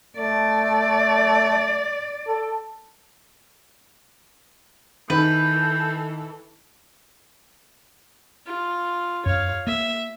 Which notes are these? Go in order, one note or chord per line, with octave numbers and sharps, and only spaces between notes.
A3 D5
A4
D#3 E3 A4 B4 G6
F4
F#2 C#5 F5
A#3 E5